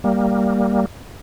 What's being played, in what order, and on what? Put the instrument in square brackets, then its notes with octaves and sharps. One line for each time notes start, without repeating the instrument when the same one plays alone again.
[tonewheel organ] G3 A#3